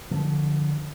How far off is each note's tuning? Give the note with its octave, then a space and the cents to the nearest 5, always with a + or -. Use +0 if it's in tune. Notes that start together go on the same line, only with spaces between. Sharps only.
D3 +5 F3 +0